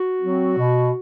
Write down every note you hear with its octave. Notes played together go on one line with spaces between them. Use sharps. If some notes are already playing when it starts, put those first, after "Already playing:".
Already playing: F#4
F#3 C4
B2